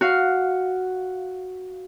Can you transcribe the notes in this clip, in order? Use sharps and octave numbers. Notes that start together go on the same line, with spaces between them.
F#4 F5